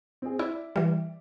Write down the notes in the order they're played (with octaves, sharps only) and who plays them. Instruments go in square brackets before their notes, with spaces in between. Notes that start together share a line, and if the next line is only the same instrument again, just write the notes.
[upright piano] C4 G#4
[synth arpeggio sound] E4 [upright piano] D5 E5
[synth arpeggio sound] E3 G3